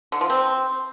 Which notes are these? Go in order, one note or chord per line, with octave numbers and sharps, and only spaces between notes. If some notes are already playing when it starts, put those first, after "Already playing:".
D3
F3
C4